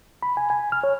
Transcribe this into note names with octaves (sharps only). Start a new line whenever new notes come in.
B5
G#5
G#5
F6
C#5